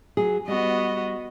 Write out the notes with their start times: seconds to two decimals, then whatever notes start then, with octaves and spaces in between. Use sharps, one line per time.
0.17 F#3 G#4
0.48 G3 B3 F#4 D#5